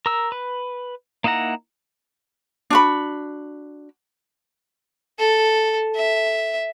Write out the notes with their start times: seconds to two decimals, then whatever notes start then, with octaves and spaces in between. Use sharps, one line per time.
0.06 A#4 E6
0.32 B4
1.24 A#3 D#4 E4 F#5 A#5
2.70 D4 F#4 B5
5.19 A4
5.96 E5